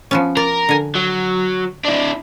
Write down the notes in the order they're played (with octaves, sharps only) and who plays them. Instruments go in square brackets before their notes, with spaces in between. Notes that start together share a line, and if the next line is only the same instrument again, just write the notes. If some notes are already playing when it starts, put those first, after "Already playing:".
[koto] F3 B3 C#4
[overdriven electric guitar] A#4 [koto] D5
[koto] D3 G#5
[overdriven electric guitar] F#3
D4 E4